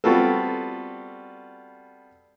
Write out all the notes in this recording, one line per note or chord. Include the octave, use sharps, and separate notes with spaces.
G3 B3 C4 F4 F#4 A4